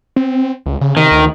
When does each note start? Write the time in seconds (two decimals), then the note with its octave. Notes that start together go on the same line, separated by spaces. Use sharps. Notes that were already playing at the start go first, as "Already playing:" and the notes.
0.16 C4
0.66 C#2
0.81 C#3
0.97 C3 D#3
1.11 D2